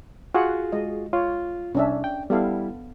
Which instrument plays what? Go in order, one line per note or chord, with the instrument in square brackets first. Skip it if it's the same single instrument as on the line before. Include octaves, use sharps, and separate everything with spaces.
[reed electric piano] F4 F#4 G#4 [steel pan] F#5
[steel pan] G#3 D#5
[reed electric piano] F4 [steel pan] C#5
[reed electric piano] C2 [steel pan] C#4 D4 E5
[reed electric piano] G5
[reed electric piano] G3 E4 [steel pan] B3 A4 F5